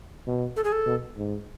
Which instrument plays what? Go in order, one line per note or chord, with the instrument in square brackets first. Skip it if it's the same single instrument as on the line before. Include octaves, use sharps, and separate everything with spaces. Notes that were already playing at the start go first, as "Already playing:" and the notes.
[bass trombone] B2
[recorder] A4
G#4
A4
[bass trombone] B2
G#2